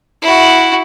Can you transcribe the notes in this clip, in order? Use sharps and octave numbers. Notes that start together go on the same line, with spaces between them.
E4 F#4